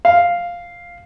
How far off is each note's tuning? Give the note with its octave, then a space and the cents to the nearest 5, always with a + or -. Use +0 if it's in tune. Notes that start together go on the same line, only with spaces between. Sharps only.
F5 +0